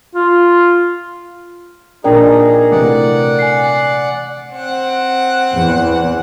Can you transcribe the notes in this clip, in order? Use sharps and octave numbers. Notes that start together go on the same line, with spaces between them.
F4
A#2 D4 D#4 G#4 A#4 D5 G5 A#5
C3 E3 A3 D5 F#5
G#5 C7
C4 F#5
E2